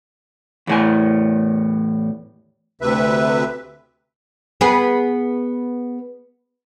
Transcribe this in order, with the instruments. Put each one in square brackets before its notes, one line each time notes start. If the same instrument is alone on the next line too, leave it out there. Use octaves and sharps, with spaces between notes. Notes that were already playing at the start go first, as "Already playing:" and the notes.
[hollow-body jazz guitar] E2 A2 G#5
[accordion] D2 C3 B4 E5
[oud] B3 G#4 B4